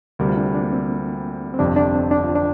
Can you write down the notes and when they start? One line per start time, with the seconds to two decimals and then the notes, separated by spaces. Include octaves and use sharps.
0.19 D2 C3 G3 A#4
0.29 F4
0.37 D4
0.54 D4
0.64 A#3
0.72 C4
1.54 C4
1.59 G1 F2 C3 D4
1.76 D4
1.95 C4
2.11 D4
2.24 F4
2.35 D4